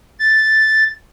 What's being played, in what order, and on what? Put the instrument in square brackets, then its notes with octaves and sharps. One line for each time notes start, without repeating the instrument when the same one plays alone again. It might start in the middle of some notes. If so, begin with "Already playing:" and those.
[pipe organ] A6